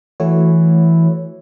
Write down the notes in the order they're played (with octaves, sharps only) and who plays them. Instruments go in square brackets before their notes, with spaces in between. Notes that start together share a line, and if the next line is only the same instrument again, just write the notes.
[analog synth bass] E3 [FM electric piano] A3 F#4 C#5